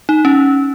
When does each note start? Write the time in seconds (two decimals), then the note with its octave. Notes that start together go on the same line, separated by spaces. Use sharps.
0.09 D#4
0.25 C#4